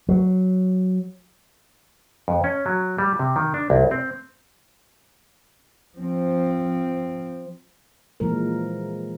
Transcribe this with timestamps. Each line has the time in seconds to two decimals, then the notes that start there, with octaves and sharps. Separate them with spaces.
0.09 F#3
2.28 F2
2.44 C#4
2.66 F#3
2.98 G3
3.19 C3
3.36 D#3
3.54 D4
3.70 C2
3.91 C4
5.98 F3 C4
8.20 A#2 E3 F3 G#3 A#4